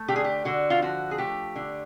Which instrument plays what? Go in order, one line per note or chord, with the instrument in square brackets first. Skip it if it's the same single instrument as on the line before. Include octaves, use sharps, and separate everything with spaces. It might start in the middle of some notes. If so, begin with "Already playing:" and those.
Already playing: [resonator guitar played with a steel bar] A3
D3 G4
G#4
G4
D3 F#4
F4
F3 F#4
G#4
A3 G4
D3